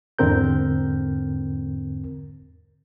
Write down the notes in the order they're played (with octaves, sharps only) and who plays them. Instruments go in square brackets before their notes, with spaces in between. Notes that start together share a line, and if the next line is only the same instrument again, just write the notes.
[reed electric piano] E2 G#2 D3 C4 A#4 G6